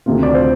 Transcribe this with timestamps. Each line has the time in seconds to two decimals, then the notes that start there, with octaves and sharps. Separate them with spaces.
0.06 D2 C3 D#3 F4
0.23 D5
0.34 C5